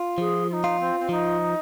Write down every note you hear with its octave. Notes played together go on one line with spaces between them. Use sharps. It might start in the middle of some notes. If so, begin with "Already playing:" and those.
Already playing: F4
F3 G#4
F4
D#4
F4
C4
C4
F3 D#4